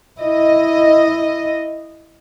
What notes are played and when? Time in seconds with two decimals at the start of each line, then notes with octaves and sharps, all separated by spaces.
0.21 E4 D#5